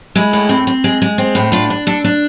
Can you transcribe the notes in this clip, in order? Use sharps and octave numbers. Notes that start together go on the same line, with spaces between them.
G#3 E4
A2
C4
C4
G#3
G#3
C4
A2
D4 F4
D4
D4 A4
D4